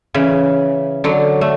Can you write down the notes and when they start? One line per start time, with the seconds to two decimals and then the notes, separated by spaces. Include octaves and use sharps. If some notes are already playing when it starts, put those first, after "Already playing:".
0.14 C#3 E3
1.04 D3 F#3
1.41 A3